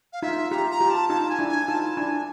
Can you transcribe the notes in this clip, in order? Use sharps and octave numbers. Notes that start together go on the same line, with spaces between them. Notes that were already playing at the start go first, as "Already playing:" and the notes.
F5
D#4 F4 E5
F4 G4 A#5
A#5
F4 G4
A5
D#4 F4 A5
G#5
D4 E4
G#5
D#4 F4 A5
D4 E4 G#5